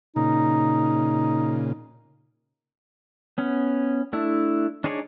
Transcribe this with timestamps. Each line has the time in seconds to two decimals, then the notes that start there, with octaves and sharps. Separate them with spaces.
0.16 A#2 C#3 D#4
3.38 B3 C#4
4.13 A3 D4 E4
4.84 D4 D#4 G#4 C#5 D5